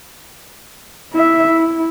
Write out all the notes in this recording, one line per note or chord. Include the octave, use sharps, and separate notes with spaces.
E4 E5
E4